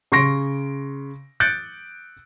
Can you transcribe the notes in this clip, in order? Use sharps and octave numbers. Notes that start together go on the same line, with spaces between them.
C#3 C6 C#6 A#6 D7
F#6 G6 A6 C#7 D7